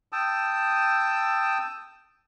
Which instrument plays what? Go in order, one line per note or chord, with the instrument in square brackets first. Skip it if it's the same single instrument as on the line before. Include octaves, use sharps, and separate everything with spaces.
[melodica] G5 A5 D#6 E6